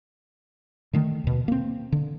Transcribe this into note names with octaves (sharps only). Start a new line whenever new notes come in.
D3 D#3 A3
D#2 B2
A#3 C4
D3